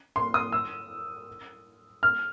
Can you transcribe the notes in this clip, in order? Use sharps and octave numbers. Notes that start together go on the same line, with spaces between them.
C6
D#6
E6
F6